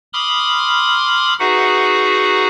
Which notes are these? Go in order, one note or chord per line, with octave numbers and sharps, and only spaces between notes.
B5 C6 D6 D#6 F6
D#4 F#4 G#4 B4 E5 F#5